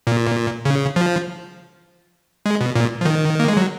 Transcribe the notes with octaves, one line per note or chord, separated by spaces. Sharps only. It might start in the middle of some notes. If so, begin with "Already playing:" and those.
A#2
C#3
F3
G#3
B2
A#2
F3
D#3
A#3
G#3
F#3